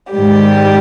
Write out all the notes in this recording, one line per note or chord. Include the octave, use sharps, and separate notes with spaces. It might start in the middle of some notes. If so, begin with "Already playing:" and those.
G#2 D#3 G3 G4